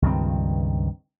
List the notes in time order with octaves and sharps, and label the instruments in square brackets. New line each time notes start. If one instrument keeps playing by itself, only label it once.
[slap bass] C#2 G2 D#3 C4